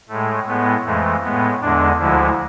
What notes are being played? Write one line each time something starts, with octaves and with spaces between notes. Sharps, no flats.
A2 G#3 A3
A2 G#3 B3
F2 E3 G#3 A3
A2 G#3 B3
E2 D3 G#3 D4
D2 D3 F3 G#3 E4